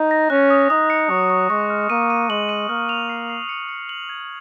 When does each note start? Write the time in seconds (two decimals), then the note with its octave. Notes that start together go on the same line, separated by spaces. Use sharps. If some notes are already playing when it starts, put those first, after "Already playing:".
Already playing: D#4
0.11 A#6
0.30 C#4 F#6
0.50 D#6
0.70 D#4 D#6
0.90 C#7
1.10 F#3 C#6
1.30 C#6
1.50 G#3 C#6
1.70 F6
1.90 A#3 D#7
2.10 D#7
2.29 G#3 F#7
2.49 D#7
2.69 A#3 F6
2.89 F7
3.09 C7
3.30 C7
3.49 C#7
3.69 C#7
3.89 F#7
4.09 G#6